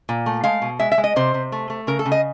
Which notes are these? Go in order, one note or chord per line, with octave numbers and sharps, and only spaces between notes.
A#2
A3
G#3 F5
B2
G#3 E5
E5
G#3
D#5
C3 C5
C3
A3
A3
C#3 A#4
A4
C#3
D#5